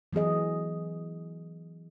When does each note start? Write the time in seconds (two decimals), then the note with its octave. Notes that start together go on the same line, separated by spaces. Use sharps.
0.13 E3 F#3 B3 G#4 D#5